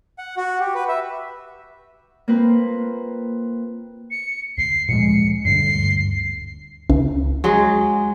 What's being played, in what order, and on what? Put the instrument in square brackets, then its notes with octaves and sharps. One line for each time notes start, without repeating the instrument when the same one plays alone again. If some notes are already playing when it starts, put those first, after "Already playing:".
[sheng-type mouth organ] F#5
F#4
G4
B4
E5
[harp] A#3 C4 F4 B4
[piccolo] C#7
[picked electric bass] D2 [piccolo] C7
[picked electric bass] A#2 F3 G#3 [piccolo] C#7
[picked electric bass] D#1 D2 G2 [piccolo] C7
[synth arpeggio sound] C#2
[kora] F#3 G#3